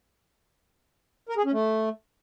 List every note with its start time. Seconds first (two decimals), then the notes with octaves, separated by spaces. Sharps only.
1.29 A#4
1.37 G#4
1.45 C#4
1.53 A3